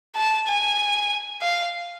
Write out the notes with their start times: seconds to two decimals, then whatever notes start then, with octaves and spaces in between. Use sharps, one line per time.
0.16 A5
0.48 G#5
1.42 F5